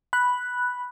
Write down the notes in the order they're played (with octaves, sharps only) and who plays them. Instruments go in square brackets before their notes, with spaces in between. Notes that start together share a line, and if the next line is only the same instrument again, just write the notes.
[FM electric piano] B5 F#6